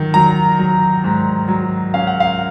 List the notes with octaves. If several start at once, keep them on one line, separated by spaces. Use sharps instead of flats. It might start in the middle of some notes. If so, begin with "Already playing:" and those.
Already playing: D#3 F#3
F#3 A#5
F#3
G#2
F#3
C#4 F5
F#5
F5